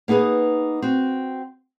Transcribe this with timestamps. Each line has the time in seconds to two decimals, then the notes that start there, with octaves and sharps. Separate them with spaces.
0.08 A#3 B3 D#4 G#4 B4
0.82 C4 F#4